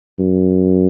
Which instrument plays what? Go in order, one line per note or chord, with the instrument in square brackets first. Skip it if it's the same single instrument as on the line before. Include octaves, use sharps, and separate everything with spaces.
[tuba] F#2